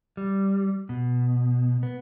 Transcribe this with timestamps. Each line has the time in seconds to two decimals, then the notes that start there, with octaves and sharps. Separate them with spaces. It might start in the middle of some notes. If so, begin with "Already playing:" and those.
0.17 G3
0.89 B2
1.83 B3